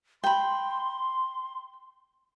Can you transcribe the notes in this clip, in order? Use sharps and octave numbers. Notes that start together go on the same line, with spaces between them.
G5 B5 C6